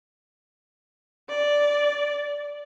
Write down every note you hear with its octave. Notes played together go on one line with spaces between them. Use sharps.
D5